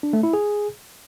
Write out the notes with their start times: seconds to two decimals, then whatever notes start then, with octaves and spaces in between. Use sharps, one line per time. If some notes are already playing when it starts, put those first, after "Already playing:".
0.03 D4
0.13 A3
0.23 E4
0.33 G#4